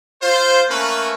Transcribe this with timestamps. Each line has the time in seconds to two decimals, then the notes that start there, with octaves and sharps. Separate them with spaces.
0.22 F4 C5
0.68 A3 A#3 C#4 A#4 B4